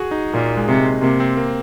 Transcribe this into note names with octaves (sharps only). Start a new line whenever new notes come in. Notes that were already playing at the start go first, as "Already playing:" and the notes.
Already playing: F#4 G#4
D#4
A#2 A#3
G#3
C3
G#3
C3 A#3
C4
A#3